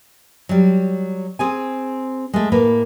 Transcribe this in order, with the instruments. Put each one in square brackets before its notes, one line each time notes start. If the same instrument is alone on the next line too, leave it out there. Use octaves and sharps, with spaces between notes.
[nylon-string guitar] F#3 G3
C4 G#4 G#5
G#3 A3
A2 A#3 B4